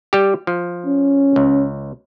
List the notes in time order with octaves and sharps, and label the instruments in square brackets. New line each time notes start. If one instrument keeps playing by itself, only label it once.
[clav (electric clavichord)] G3 G4
F3
[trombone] C#4
[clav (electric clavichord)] C#2